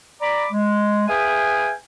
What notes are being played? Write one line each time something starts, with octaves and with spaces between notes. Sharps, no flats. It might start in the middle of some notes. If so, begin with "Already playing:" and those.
D5 A#5 B5 D6
G#3
G#4 B4 E5 F5 G5 G#5